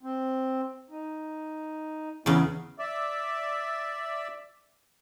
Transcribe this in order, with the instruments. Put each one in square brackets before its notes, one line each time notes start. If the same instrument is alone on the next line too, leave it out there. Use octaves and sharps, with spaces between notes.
[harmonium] C4
D#4
[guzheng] E2 C#3 [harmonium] B3 C#4 E4
[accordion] D5 E5